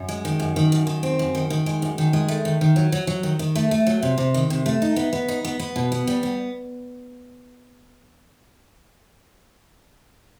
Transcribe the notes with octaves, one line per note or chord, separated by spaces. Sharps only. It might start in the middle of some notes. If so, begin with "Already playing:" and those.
Already playing: F#2
G#3
D#3
F#2
D#3
F#2
D#3
C4
F#2
D#3
D#3
G#3
F#2
D#3
G#3
A3
D#3
D#3
F#3
F#3
F#3
D#3
D#3
A3
A3
F#3
C3
C3
D#3
C3
A3
D#4
B3
B3
D#4
B3
B3
B2
B3
G3
B3